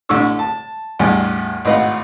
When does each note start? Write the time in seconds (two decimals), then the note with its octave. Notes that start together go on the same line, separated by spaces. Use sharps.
0.09 A1 D3 C#6 E6
0.39 A5
0.99 A1 E2 G2 G#5
1.65 G#1 A2 B4 D#5 F5 F#5